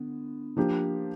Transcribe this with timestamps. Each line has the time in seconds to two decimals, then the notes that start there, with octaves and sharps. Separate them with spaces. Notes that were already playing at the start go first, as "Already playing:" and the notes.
Already playing: D3 B3
0.57 F3 A#3 D4 G4